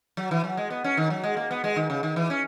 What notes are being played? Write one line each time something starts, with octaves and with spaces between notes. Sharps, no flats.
F#3
E3
F#3
G#3
B3
C#4
D#3
F#3
G#3
A#3
B3
G#3
D#3
C#3
D#3
E3
C#4